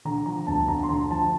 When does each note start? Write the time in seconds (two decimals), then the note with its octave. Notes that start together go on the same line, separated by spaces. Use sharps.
0.05 D3 A#5
0.26 F3 A#5
0.47 D2 A5
0.68 D2 A#5
0.83 C6
0.89 D3 A#5
1.10 F3 A5